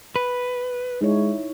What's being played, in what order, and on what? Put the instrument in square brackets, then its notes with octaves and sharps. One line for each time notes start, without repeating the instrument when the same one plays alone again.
[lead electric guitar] B4
[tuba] G#3 [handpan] D#4 E4 C#5